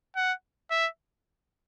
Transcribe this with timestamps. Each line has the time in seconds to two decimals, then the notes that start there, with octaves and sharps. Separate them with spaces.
0.16 F#5
0.71 E5